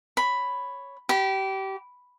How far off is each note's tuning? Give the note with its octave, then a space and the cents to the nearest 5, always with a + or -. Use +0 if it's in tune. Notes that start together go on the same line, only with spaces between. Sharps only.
C#5 +0 B5 +5
G4 -25 B5 +0